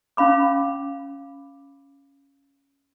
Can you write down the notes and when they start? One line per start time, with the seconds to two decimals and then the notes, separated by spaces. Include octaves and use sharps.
0.17 C#4 F5 B5 D6